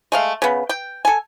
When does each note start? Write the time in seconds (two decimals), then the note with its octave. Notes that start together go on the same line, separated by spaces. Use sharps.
0.12 G#3 A3 F5
0.42 C#3 B3
0.69 G5
1.05 A4 G#5